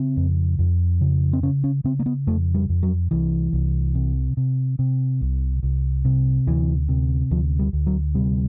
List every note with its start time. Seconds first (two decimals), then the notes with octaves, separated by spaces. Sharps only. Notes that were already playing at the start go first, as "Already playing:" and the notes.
Already playing: C#3 C4
0.17 F2
0.59 F2
1.01 C#3
1.33 C4
1.43 C#3 C#4
1.64 C#4
1.84 C#3 C4
1.99 A#3
2.06 B3
2.27 F2 A3
2.54 G3
2.69 F2
2.83 F#3
3.11 C2 E3
3.53 C2
3.95 C3
4.37 C3
4.79 C3
5.21 C2
5.63 C2
6.05 C3
6.47 D2 E3
6.89 C3
7.31 D2 F3
7.59 G3
7.73 D2
7.87 F#3
8.15 C3 G3